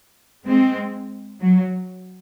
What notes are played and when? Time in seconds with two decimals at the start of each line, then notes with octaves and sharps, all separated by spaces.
0.46 G#3 C4
1.41 F#3